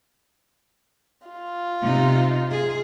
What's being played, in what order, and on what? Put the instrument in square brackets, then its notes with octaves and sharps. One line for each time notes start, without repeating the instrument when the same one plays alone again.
[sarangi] F4
[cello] C3 D#4
G#4